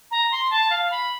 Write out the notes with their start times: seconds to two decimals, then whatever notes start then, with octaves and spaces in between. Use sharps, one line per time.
0.11 A#5
0.32 C6
0.50 A5
0.70 F5
0.91 B5